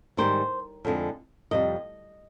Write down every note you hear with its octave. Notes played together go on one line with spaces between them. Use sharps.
G#2 D#3 G3 C5
F2 D3 G#3
F2 C3 G3 D#5